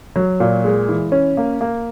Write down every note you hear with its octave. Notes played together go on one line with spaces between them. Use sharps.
F#3
A#2
G#3
E3
C#4
A#3
A#3